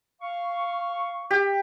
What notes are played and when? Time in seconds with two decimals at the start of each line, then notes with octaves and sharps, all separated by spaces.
0.21 F5 C#6
1.31 G4